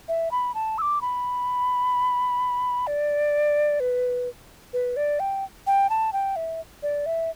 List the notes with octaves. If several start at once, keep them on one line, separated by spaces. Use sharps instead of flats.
E5
B5
A5
E6
D6
B5
D5
B4
B4
D5
G5
G5
A5
G5
E5
D5
E5